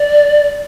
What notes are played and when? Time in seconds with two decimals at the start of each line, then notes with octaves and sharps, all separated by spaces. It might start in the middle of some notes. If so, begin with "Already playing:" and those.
Already playing: D5